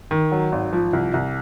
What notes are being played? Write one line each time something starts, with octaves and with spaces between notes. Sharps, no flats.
D#3
F#3
G#1
F3
C2
C2